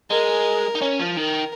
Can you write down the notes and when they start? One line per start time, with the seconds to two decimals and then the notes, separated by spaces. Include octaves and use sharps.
0.10 G#3 A#4
0.75 D#4
0.82 C#4
1.00 F3
1.17 D#3 A#4